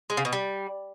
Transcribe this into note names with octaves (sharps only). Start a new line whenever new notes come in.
G#3
C#3
B2
G3